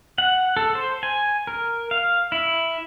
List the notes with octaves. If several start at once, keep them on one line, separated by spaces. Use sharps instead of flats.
F#5
A4
C5
G#5
A#4
F5
E4